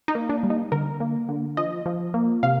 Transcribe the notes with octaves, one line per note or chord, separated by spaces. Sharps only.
D#4
A#3
D4
G3
D#4
D3 A#4
A#3
D3
F3 D#5
F3
A#3
C3 F5